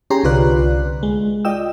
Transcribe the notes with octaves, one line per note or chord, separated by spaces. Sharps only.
C#4 G4 G#4 A#5 C6
C2 D3 F4 B4 D5 F#6
G#3
F4 D5 D#5 G5 E6